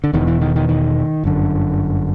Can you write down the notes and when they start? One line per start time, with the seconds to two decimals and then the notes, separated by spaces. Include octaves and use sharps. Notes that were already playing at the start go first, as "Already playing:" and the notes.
0.04 D3
0.13 E1 E2 B2 D#3
0.27 E3
0.41 D#3
0.56 D#3
0.69 D#3
1.24 G1 F#2 D3